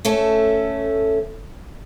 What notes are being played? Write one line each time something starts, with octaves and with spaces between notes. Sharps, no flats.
A3 C#4 A4